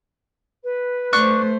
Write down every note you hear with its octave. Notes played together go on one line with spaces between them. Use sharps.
B4
A3 D4 C5 C#6 F#6